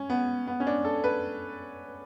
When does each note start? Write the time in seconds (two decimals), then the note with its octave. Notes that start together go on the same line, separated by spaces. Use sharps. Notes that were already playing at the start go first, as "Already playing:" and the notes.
Already playing: C#4
0.10 B3
0.47 B3
0.60 C#4
0.67 D4
0.85 A4
1.04 B4